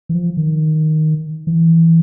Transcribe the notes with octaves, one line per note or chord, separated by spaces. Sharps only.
E3
F3
D#3
E3